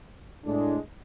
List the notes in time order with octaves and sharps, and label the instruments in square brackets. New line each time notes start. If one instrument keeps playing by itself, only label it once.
[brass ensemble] A2 G#3 D4